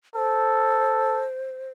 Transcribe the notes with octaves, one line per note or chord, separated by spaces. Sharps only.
A4 C5